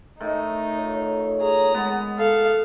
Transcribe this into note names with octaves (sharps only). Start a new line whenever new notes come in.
A2 D#3 D#4
F4 A4 C#5
G#4 A#5
G#3 B3
A4 F5